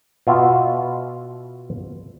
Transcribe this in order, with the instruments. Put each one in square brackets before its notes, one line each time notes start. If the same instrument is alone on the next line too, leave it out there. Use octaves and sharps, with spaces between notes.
[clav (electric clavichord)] B2 F4 E5